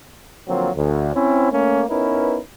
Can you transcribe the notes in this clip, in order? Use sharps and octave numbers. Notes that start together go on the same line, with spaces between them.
D3 F3 F#3 A#3 C4 F4
D2
C4 C#4 E4
A3 A#3 C#4
B3 C#4 D#4 E4 A#4 B4